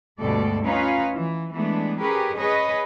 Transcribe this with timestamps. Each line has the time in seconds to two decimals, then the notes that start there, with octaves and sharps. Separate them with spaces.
0.19 D2 G2 B2 G#3 A4 D5
0.64 C#4 D#4 F4 B4 F5
1.15 E3
1.53 E3 G#3 A3 B3 D4
1.99 C#4 G4 G#4 A#4 B4
2.36 G#4 B4 C#5 D#5